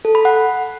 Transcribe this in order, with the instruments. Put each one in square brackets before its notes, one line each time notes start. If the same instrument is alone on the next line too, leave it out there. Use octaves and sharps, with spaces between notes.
[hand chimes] A4
B5
F#5